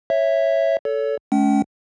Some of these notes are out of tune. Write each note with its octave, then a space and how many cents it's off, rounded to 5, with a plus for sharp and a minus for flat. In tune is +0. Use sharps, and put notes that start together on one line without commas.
C#5 -10 E5 +0
A4 +0 C#5 +30
A3 -45 C#4 +25 G5 -40